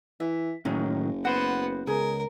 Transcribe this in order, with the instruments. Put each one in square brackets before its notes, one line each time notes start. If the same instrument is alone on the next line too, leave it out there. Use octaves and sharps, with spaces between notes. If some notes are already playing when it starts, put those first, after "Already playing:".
[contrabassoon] E3 [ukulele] E5
[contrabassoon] F#1 [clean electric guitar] A2 D#3 F#3 [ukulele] C#4 D#5
[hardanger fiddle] B3 [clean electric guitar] F#4 C5 [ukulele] F#5
[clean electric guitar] C#2 [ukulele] G#4 [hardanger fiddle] A#4